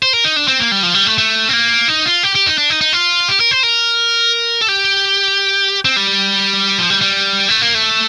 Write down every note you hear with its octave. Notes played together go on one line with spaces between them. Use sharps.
C5
A#4
D#4
D4
C4
A#3
G3
F3
G3
A3
A3
C4
A#3
D#4
F4
G4
G4
D#4
D4
D#4
D#4
F4
G4
A#4
C5
A#4
A4
G4
C4
G3
F3
G3
G3
A3
A#3
A3